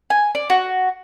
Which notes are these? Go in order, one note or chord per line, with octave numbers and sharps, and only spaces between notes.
G#5
D5
F#4